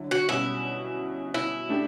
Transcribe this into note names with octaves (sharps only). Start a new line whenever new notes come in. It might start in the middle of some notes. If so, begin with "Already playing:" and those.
Already playing: D3 F#3 E4
F#4
B2 G3 C#4 E4 F#4
E4
A3 D4 G4